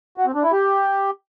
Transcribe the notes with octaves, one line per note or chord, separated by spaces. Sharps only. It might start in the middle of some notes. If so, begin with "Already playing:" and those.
F#4
C4
D4
E4
G4